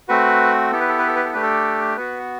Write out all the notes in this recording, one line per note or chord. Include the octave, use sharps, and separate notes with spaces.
A3 C4 F#4 B4
B3 E4 G4 A4
B4
A4
B4
A4
B4
A4
A3 D4 G4 B4
A4
B3 F#4 B4